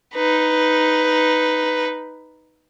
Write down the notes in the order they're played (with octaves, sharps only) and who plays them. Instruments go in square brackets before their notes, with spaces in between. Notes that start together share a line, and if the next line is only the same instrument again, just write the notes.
[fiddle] D#4 B4